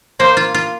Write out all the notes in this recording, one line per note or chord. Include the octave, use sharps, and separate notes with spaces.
A#3 C5
F4
F4